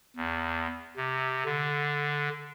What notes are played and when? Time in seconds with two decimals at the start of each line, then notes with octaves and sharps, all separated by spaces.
0.17 E2
0.97 C3
1.45 D3